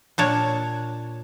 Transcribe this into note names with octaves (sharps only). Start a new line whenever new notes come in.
A#2 D4 C#5